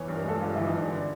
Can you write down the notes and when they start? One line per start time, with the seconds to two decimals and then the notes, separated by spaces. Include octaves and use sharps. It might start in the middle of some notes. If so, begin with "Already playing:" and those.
Already playing: E2 E3 C#5
0.08 G2
0.16 A#4
0.25 G#3 A4
0.41 G2 F4
0.54 E3 E4
0.67 D#4
0.75 G2
0.91 D3 D4